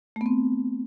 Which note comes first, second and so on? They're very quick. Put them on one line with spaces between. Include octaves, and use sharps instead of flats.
A3 B3 C4